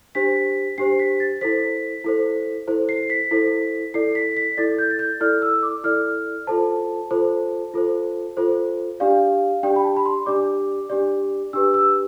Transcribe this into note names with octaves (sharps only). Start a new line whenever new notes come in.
D4 G4 C5 B6
D4 G4 C5 C7
B6
A6
E4 A4 C5 B6
E4 A4 C5
E4 A4 C5
C7
B6
E4 A4 C5
E4 A4 D5 C7
B6
B6
E4 A4 D5 A6
G6
A6
G6
E4 A4 D5 F6
E6
D6
E4 A4 D5 F6
F4 A4 C5 A5
F4 A4 C5
F4 A4 C5
F4 A4 C5
D4 G4 D5 F5
D4 G4 D5 G5
B5
A5
B5
C6
D4 G4 D5 D6
D4 G4 D5
D4 G4 B4 E6
E6